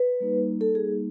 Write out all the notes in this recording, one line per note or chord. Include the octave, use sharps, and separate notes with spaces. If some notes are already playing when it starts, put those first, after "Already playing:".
Already playing: B4
G3 A#3 D#4
A4
G#4